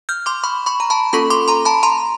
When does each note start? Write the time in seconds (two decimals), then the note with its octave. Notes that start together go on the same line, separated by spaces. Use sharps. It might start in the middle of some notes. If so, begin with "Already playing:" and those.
0.09 F6 G6
0.26 C6 D6
0.43 B5 C#6
0.66 B5 C#6
0.80 A#5
0.90 A5 B5
1.13 A#3 C#4 F4 A4 B5 C#6
1.30 C6 D6
1.48 A#5 C6
1.65 A5 B5
1.83 A#5 C6